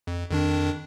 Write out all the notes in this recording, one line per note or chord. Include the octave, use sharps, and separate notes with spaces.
F2
F2 D#3 D4